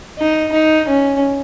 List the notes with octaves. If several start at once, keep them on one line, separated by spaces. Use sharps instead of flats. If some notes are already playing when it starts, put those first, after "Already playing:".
D#4
D#4
C#4